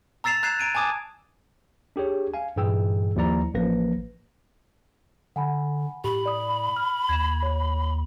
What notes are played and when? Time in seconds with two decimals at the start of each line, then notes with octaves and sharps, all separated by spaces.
0.24 A#5 E6 A6 C7 E7 F7
0.43 A#5 F#6 G#6 C7 E7
0.59 A#5 D7 D#7
0.75 G#5 A5 D6 D#6 G#6
1.96 D4 G4 G#4 C#5
2.34 F5 G#5
2.56 G2 A#2 E3 G#4 G5 E6
3.16 D#2 F3 E4 D5 A#5
3.54 A1 F3 A#3 B4 A#6
5.36 D3 F#5 G#5 B5
6.04 A2 G4 B5
6.26 D5 D#6
6.76 F6
7.09 D#2 G#6 E7
7.43 C#5